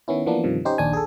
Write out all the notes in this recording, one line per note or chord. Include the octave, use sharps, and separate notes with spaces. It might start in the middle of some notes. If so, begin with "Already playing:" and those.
D#3 B3 C#4 E4
E3 F3 A#3 B3 D4
G2 C3 D#3 F3
C#4 D#4 G4 C5
A#1 D#2 D4 G#5
G#4 A4